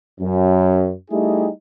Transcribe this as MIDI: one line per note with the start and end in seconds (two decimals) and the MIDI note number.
0.21 0.92 42
1.11 1.48 55
1.11 1.48 57
1.11 1.48 63
1.11 1.48 64
1.11 1.48 67
1.11 1.48 68